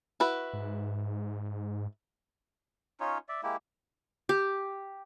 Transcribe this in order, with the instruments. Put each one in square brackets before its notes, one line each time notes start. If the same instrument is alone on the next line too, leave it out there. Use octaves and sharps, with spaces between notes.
[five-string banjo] E4 F#4 B4
[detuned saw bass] G#2
[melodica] C#4 D#4 F4 C#5
D5 E5
G#3 A#3 E4 G4
[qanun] G4